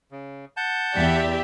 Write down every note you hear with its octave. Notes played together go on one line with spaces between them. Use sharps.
C#3
F#5 A5 G6
E2 G4 D5 E5